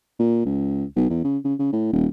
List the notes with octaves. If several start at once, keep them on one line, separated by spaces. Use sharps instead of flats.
A#2
C#2
B1
E2
C#3
C#3
C#3
A2
D#1